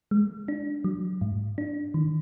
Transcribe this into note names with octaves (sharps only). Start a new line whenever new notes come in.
G#3
D4
F#3
G#2
D4
D#3